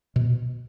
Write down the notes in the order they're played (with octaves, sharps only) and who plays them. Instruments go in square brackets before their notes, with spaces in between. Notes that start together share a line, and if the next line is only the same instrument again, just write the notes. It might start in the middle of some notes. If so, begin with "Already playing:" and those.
[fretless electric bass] B2